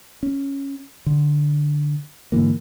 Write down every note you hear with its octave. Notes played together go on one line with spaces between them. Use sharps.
C#4
D3
G#2 D3 E3 A#3